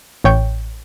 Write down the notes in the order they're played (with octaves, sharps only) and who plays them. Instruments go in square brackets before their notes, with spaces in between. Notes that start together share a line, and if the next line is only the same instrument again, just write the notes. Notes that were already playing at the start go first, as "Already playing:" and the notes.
[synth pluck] A1 C#5 G5